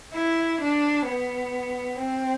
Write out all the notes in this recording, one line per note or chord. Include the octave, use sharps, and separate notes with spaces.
E4
D4
B3
C4